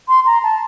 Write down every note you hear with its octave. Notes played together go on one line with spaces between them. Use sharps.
C6
A#5
A5